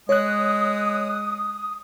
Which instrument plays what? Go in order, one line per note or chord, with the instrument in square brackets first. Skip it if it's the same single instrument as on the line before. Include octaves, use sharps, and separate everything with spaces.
[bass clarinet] G#3 [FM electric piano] C#5 F#6 [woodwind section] D#6